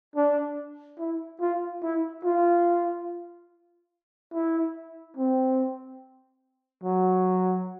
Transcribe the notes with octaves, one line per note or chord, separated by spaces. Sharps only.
D4
E4
F4
E4
F4
E4
C4
F#3